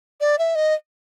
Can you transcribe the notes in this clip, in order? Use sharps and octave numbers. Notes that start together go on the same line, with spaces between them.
D5
E5
D#5